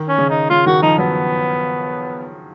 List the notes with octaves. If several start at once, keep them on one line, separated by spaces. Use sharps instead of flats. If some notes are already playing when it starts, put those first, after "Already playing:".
Already playing: D#3
C#4
C#3
D#4
C#3 F4
D#3 F#4
F3 D#4
F#3 B3